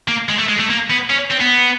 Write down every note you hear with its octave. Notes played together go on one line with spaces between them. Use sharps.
A#3
G#3
A3
G#3
A3
A#3
B3
C#4
C4
B3